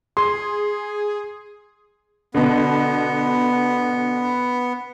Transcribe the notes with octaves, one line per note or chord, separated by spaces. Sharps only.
G#4 C6
B2 D3 B3